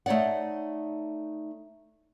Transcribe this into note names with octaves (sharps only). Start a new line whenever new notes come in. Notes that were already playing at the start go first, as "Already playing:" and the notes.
A3 D#4 C#5 D5 F#5